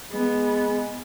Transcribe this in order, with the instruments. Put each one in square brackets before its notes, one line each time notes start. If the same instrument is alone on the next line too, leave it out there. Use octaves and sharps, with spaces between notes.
[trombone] G#3 [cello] B3